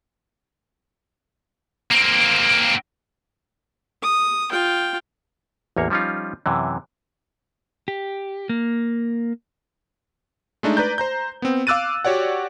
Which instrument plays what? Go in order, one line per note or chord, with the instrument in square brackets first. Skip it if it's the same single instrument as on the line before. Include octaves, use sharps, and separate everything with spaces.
[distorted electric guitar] A#3 C4
[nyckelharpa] D#6
F4 G5
[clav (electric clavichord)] A1 E2 A#3 C#5
F3 G3 C#4 D#4 F4
F#2 C3 E3
[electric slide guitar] G4
A#3
[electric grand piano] G#3 A3 D4 D#4
B4 D5 A#5 G6
C5 A#5 G6
B3 C4
F5 D6 E6 F#6 A6 D#7
F#4 G4 C#5 D5 F#5